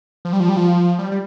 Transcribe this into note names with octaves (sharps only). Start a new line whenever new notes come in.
F3
G3
F3
G3
F3
G3
G3